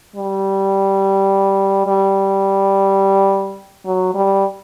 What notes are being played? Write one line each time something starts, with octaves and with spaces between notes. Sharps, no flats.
G3
G3
F#3
G3